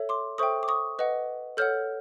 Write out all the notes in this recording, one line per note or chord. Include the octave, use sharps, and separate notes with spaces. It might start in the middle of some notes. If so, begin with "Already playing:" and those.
Already playing: A4 C#5 E5
C6 D6
A4 C5 E5 G5 C#6 D#6
D6
C#6 D#6
B4 D#5 F#5
A4 C#5 F#5 F6 G6